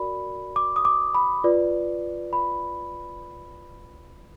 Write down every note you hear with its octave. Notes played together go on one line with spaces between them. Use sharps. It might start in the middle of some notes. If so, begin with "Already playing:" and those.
Already playing: F#4 A#4 D5 B5
D6
D#6
D6
B5
F4 B4 D5
B5